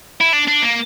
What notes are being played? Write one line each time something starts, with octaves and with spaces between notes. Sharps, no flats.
E4
D4
D4
A#3